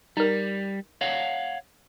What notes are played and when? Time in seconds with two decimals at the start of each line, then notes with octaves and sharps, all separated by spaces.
0.17 G3 D#4 A#4
1.01 C#5 F5 F#5